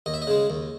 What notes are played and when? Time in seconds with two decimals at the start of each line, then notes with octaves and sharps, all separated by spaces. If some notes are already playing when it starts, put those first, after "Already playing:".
0.06 D#2 D#5
0.14 E5
0.22 D#5
0.27 C#3 G#3
0.50 D#2